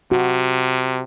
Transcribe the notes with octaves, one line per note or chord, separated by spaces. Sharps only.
C3 F#4